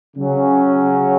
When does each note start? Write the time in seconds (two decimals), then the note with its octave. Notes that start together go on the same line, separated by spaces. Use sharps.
0.16 C#3 F#3 C#4